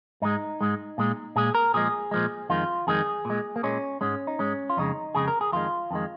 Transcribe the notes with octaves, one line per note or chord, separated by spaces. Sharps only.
G#2 G#3 D#4
G#2 G#3
A#2 G#3
A#2 G#3 G#4
A#4
A#2 F3 G#3 G#4
A#2 F3 G#3
F2 D#3 G#3 F4
F2 D#3 G#3 G#4
A#2 G#3
A#3
A#2 G#3 C#4
G#2 G#3 C#4
D#4
G#2 G#3 C#4
F4
F2 C#3 G#3 D#4
F2 C#3 G#3 G#4
A#4
G#4
F2 D#3 G#3 F4
F2 D#3 G#3